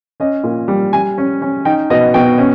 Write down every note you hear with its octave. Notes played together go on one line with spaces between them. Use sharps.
C#4 D#5
A#2
G3
G3 G#5
C#4
C#4
D#4 G5
B2 D#5
B2 G5
C#4